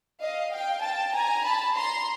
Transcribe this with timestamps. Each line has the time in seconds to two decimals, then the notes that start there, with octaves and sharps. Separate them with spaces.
0.20 D#5 F5
0.51 F5 G5
0.82 G5 A5
1.13 G#5 A#5
1.43 A5 B5
1.75 A#5 C6